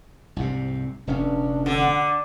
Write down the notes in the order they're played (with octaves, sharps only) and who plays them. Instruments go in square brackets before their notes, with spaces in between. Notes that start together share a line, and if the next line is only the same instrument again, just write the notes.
[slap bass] C2 G#2 C3
[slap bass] F1 A#1 C#4 [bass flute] D4
[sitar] D3 [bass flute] F#5